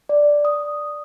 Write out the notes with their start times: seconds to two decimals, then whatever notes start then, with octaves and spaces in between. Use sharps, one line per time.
0.09 D5
0.45 D#6